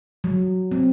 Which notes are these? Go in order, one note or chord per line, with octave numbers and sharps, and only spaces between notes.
F#3
C4